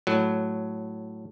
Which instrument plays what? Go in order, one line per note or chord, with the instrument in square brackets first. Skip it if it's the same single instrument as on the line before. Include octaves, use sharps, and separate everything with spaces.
[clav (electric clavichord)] A2 F#3